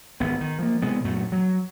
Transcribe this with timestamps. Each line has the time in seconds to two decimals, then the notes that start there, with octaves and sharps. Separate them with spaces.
0.20 G#1 B3
0.41 D#3
0.59 F3 A#3
0.82 C3 G#3 B3
1.04 F#2 A#2 F#3 A3
1.32 F#3